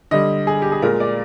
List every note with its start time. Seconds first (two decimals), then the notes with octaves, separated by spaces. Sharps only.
0.11 D3 G3 D#5
0.47 G#4
0.62 G4
0.72 G#4
0.82 A#2 G#3 A#4
1.00 D5